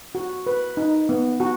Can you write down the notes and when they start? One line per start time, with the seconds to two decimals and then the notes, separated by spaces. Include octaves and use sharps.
0.15 F#4
0.47 B4
0.77 D#4
1.09 B3
1.40 F#4